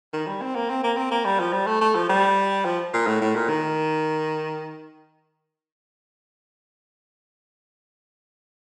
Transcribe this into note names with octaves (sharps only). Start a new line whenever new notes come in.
D#3
G3
C4
A#3
C4
A#3
C4
A#3
G3
F3
G3
A3
A3
F3
G3
F3
A#2
A2
A2
A#2
D#3